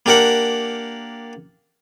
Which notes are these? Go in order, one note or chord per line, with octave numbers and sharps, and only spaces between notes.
A#3 D4 G4 A#4 F#5